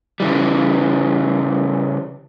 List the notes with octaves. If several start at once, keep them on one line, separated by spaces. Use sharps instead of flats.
C#3 E3 G3